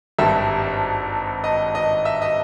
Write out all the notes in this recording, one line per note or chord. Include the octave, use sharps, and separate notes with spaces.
G#1 G2 G3 E5
D#5
D#5
E5
D#5